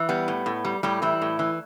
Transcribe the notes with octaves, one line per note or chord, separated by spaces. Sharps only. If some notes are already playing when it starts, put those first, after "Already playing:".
Already playing: E3
G3 B3
A2
A2
G3
A2 G3 G4
E3 G3 E4
A2
E3